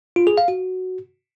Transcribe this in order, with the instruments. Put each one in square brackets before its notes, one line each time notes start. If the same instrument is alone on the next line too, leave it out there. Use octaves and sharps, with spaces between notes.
[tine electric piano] F4
G#4
F5
F#4